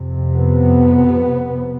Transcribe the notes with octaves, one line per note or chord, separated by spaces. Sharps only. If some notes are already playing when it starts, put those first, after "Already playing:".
Already playing: F2 C3
B3